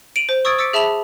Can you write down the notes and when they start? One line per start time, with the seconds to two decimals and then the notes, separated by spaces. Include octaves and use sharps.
0.16 D7 D#7 F7 F#7
0.29 C5
0.45 C#6 D#6 E6 G#6 A6 D7
0.58 D6 E6 A6 B6 C#7 D7
0.73 G#4 E5 A5 B5 F7 F#7